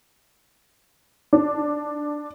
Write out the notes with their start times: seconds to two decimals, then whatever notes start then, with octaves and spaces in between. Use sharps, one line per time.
1.33 D4